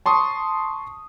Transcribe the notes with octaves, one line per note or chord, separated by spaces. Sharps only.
A5 C6 C#6 D#6